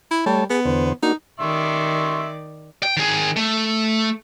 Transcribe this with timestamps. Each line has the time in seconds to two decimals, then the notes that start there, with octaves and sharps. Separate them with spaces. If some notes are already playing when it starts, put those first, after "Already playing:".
0.11 E4
0.26 G3 A3 C#5 A5
0.50 B3 G#4
0.66 E2 D3 C5
1.03 A#3 D4 D#4 F#4
1.40 D#3 D5 E5 C6 C#6
2.83 G5
2.97 D#3 G#4
3.36 A3